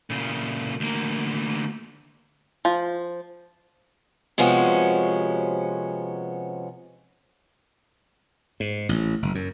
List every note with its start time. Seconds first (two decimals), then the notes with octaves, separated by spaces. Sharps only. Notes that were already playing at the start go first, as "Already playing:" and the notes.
0.10 A#2 C#3
0.80 D2 A#3
2.65 F3
4.38 C3 F3 G#3 B3 C#4 F#4
8.60 G#2
8.89 A1
9.22 F#1
9.35 F#2